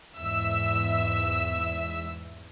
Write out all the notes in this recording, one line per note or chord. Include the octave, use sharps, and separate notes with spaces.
E2 G#2 E5 E6